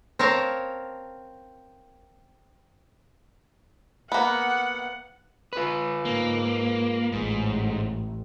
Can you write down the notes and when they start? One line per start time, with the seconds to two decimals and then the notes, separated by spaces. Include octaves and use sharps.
0.19 C4 A#4 C#5 F5 A5
4.12 A#3 B3 F#5
5.53 F4 B4
6.05 G#2 A#3
7.12 A1 G#2